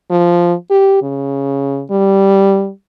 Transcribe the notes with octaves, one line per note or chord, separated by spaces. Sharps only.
F3
G4
C#3
G3